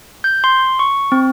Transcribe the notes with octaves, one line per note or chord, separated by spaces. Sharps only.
G6
C6
C#6
C4